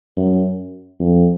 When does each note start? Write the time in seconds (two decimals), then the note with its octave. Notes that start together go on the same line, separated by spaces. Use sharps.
0.16 F#2
0.99 F2